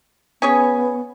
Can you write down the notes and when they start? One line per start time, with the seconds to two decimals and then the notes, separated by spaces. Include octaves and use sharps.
0.42 B3 C#4 G#4 C#5